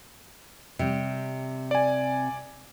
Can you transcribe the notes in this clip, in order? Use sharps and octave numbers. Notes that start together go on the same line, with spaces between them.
C3 G3
D5 G#5